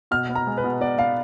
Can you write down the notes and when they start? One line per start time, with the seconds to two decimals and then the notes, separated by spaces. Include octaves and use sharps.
0.11 B2 F6
0.29 B3
0.35 A#5
0.47 G#3
0.57 B4
0.64 B2
0.80 B2 D5
0.98 B3 F5